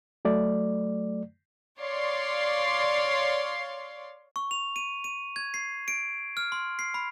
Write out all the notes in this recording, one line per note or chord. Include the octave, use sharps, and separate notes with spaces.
F#3 A3 D5
C#5 D5 F5 C6
C#6
F7
D#7
D#7
G#6
C7
D7
F6
C6
C7
B5